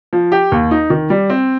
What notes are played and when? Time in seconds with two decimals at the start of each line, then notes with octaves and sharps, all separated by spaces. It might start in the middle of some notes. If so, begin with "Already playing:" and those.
0.13 F3
0.32 G4
0.52 D#2
0.71 D#4
0.90 D#3
1.10 G3
1.30 C4